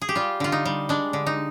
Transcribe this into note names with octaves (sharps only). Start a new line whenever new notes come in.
G#4
G4
G3 F4
D3 F4
D#4
G3
G#3 D4
D3
D#4